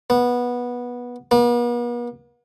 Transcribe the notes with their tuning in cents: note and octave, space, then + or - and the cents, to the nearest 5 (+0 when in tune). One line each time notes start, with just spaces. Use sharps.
B3 -15
B3 -45